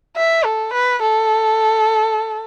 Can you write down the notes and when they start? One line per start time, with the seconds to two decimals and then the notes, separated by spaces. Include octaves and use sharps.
0.16 E5
0.45 A4
0.73 B4
1.02 A4